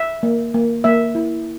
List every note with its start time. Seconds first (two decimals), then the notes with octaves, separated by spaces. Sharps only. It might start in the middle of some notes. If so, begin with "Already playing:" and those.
Already playing: E5
0.23 A#3
0.54 A#3
0.84 A#3 E5
1.15 E4